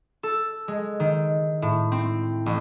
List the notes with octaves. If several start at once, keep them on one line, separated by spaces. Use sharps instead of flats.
A4
G#3
D#3
A2
C4
A1